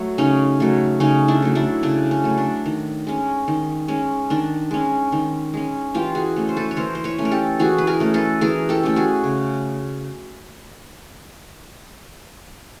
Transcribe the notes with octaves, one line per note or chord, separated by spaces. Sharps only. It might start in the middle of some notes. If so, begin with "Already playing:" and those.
Already playing: F#3 A3
C#3 C#4 D#4
F#3 A3
C#3 C#4 D#4
D4 E4
F#3 A3
D4 E4
C#3 D4
C#4
F#3 A3
D4
D#3
G#3 C#4
D#3
G#3 C#4
D#3 D4
G#3 C#4
D#3
G#3 C#4
E3 F4 G4
F#4 G#4
A3 C#4
C5
A4 B4
C#5
E3 A#4 C5
C5
B4 C#5
A3 C#4
A#4
G4 A4
E3 F#4 G#4
B4
G#4 A#4
A3 C#4
A4 B4
E3 G#4 A#4
G4 A4
A3 C#4 G4
F#4 G#4
C#3